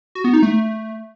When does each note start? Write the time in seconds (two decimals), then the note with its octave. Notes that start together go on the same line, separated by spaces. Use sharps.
0.15 F#4
0.24 B3
0.33 D#4
0.42 A3